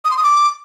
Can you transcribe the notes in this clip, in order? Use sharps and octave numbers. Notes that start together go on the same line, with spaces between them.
D#6
C6
D#6
D6